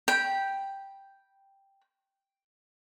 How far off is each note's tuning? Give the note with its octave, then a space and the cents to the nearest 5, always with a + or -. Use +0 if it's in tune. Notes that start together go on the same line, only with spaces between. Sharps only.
G5 +0 B5 -20